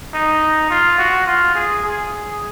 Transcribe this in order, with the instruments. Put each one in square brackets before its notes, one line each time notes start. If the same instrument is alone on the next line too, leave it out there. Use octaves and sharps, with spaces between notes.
[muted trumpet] D#4
F4
F#4
F4
G#4
G#4